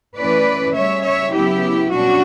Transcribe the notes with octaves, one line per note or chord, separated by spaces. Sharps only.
E3 A3 C#4 B4 D5
C#3 G3 C#4 C#5 E5
C#5 E5
C#3 F#3 B3 E4 G4
B2 G3 C#4 D4 F#4